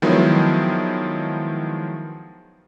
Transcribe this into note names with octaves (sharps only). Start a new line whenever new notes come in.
D#3 F3 F#3 G#3 B3 E4